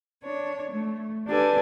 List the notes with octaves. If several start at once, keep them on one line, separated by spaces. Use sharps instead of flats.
D4 C#5
A3
D4 G4 A4 B4 G#5